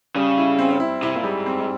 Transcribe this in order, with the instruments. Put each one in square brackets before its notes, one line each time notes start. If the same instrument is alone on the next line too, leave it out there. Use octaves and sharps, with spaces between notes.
[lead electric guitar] C#3 [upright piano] G3
[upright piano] E4
C4
E4
[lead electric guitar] C3 [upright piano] E4
[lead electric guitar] A#2
[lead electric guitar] G#2 [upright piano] G3
[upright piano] C4